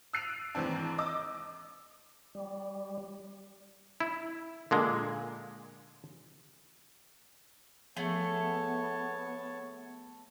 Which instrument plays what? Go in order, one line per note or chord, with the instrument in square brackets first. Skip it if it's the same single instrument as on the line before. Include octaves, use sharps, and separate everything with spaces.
[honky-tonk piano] E6 F#6 C7 D7 D#7 F7
D#2 G#2 E3 C4 D4
D#5 D6 E6
[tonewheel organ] G3
[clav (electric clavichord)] E4
A#2 D3 G#3
[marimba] F3 [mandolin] A3 G#4 A4 [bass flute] B3 [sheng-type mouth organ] C#5 A5